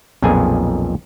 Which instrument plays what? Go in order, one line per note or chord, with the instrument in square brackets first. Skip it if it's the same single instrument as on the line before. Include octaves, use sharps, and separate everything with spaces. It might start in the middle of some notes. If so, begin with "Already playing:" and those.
[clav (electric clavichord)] B1 F2 A#2 G#4 G#5